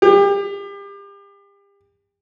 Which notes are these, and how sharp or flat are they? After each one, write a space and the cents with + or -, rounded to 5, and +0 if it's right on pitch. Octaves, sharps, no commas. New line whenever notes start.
G4 +35